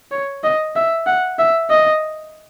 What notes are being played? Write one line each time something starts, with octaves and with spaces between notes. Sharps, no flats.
C#5
D#5
E5
F#5
E5
D#5